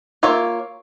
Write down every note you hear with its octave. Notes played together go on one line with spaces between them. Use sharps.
A#3 F4 A#4 C#5 E5